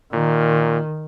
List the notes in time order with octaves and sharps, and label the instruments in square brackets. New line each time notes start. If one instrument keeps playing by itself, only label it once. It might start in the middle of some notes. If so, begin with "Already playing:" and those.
[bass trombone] A#2 [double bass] D#3